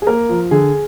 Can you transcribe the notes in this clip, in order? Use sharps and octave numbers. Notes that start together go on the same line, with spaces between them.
G#4
A#3 A#4
F3
D3 G#4